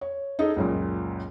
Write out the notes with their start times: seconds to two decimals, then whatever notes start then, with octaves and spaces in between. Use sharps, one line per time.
0.01 C#5
0.39 D#4 G#4 A4 D#5
0.56 C#2 F#2 A#2